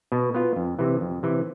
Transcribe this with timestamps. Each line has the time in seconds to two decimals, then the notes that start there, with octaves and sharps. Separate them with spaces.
0.12 B2
0.34 B3 F4
0.56 F2
0.79 C3 E3
1.01 F2
1.23 C3 E3